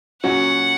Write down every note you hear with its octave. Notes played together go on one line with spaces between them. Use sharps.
A#2 F#3 C#4 F#4 F#5